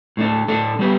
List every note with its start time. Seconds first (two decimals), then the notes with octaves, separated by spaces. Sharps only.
0.17 A2 A3 D4 A4
0.48 A2 A3 D4 A4
0.79 G3 B3 G4 B4